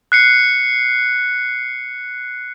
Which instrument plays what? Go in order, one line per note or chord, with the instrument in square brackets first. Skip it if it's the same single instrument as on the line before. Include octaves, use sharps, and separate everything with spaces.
[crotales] F#6 C7 C#7